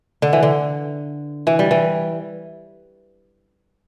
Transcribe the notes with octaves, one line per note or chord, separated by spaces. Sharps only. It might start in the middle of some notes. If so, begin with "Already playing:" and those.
D3
E3
D3
E3
G3
E3